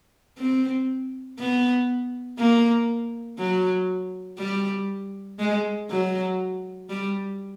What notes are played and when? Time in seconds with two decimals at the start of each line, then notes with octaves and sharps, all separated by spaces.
0.38 C4
1.39 B3
2.38 A#3
3.38 F#3
4.39 G3
5.39 G#3
5.90 F#3
6.89 G3